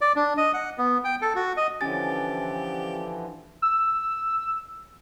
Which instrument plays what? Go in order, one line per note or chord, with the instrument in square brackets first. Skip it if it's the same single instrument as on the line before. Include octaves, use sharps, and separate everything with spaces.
[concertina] D5
D4
D#5
F#5
B3
G5
A4
F#4
D#5
[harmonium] D3 E3 F3 [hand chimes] C#4 G#5 A6 [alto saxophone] G4
[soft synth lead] E6